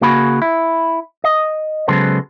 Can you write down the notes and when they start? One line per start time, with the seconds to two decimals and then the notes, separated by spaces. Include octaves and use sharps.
0.01 C#3 A#3 F#4 G#4 B5
0.42 E4
1.24 D#5
1.88 C#3 F#3 G#3 B3 A4 C5